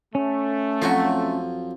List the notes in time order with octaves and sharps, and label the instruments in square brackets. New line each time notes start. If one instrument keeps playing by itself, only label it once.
[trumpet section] A3 [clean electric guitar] C#4
[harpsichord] F2 F4 G#5 [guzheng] F3 F#3 F#4